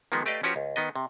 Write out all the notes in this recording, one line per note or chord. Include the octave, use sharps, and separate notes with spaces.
D#3 F3 G#3 A#3 B3
A3 G4 B4 D5 D#5 F5
F3 C#4 F#4 G4 B4 C#5
C#2
D#3 B3 D#5
C3